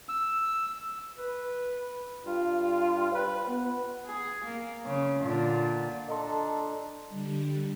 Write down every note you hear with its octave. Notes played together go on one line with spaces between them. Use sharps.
E6
B4
G2 F4
B4
B3
G#4
A#3
C#3
A#2 D3
D4 A4 D#5 A#5 C6
D3 G3